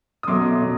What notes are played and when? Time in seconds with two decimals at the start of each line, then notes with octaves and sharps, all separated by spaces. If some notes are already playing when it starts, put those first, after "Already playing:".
0.23 D#6
0.27 B2 F#3 A3 C6 D6
0.61 B2 F#3